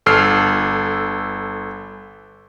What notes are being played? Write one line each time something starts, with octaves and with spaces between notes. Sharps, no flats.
G1 A4 E6 F6 C7